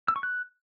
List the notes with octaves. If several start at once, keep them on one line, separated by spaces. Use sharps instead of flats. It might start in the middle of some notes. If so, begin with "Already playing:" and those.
E6
C#6
F#6